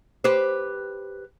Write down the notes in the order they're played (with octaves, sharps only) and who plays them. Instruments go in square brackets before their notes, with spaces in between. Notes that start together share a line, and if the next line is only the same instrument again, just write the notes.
[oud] G4 B4 C5